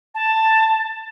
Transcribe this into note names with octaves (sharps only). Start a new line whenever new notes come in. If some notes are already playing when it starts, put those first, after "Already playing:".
A5